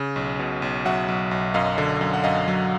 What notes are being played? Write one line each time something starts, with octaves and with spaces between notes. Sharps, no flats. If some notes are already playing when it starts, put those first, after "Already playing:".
Already playing: C#3
B1
B2
B1
F#3 E5 F#5
B1
B1
F#2 D#5 F5
D3
F#2
F#5
F#2 D#5 F5
F#3